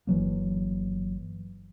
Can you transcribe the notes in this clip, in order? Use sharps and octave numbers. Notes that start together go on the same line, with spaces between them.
G1 E3 F#3 A#3